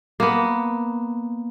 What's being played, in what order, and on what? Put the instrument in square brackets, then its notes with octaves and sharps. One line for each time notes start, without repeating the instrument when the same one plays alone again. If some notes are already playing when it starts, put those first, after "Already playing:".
[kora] A#3 B3